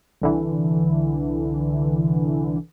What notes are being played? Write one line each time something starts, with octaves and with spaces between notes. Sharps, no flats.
C2 D3 E3